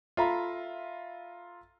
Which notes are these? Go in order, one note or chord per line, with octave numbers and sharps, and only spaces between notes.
F4 A4 E5 A#5 B5